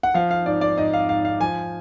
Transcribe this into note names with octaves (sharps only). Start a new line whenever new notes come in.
F#5
F3 F5
F5
G#2 D5
D5
G#2 D#5
F5
G#2 F5
F5
F3 G#5